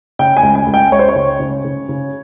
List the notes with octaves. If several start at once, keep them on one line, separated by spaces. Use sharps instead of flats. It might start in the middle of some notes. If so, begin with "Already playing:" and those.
C#3 G5
G#5
C#2
G#5
C#2
G5
C#2 C#5
C5
C#5
C#3
C#3
C#3
C#3